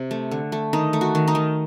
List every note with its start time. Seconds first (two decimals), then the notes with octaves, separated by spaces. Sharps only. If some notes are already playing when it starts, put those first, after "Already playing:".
Already playing: C3
0.11 A3
0.31 D3
0.52 A3
0.73 D#3 D#4
0.93 A3
1.01 F#4
1.15 D#3
1.28 D#4
1.35 D#3